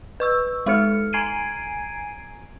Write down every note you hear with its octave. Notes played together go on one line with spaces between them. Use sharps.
B4 C#6 E6
G#3 D#4 A4 F6 C#7
G#5 A#5 G#6 C7 D7 D#7